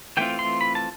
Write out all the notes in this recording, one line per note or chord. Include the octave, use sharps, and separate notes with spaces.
E3 A3 C4 F4 G5
C6
B5
A5